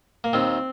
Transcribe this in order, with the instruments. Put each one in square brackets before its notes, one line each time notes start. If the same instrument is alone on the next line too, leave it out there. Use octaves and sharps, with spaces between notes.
[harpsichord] A#3
D#2 D#3 C4